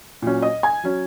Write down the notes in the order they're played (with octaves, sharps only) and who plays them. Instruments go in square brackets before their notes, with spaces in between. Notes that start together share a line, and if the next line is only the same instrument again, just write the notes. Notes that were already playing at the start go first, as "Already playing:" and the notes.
[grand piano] A#2 F#3 C#4
D#5 D#6
G#5 G#6
F#3 C#4